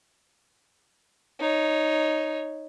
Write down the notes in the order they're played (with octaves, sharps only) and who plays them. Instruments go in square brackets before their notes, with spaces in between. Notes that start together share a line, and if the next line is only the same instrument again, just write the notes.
[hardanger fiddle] D#4 C#5